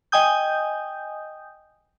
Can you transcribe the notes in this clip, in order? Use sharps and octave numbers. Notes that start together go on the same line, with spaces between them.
D#5 G5 G#5 D#6 G6